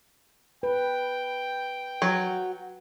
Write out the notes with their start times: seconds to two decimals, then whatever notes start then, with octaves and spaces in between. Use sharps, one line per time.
0.63 B4 G5
2.02 F#3